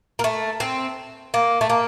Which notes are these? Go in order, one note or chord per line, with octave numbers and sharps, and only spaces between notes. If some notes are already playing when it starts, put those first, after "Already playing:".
A#3
A3
C4
A#3
A3
A#3